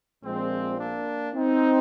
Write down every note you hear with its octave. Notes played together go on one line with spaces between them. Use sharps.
A#1 A#2 F3 G#3 C4
A#3 D4
C4 D#4